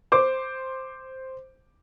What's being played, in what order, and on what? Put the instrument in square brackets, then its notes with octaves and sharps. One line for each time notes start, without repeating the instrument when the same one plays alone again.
[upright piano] C5 D6